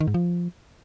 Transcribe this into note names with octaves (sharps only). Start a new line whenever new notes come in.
D#3
G#2
F3